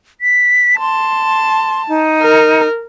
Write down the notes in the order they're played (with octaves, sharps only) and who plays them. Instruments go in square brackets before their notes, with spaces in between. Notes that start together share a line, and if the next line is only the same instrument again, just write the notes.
[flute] B6
[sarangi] A5 [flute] C6
[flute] D#4
[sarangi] A#4